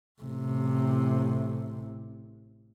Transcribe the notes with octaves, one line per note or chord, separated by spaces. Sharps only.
A1 C3